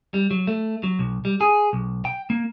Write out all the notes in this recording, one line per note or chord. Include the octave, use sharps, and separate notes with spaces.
G3
F#3
A3
F#3
B1
G3
G#4
B1
G5
A#3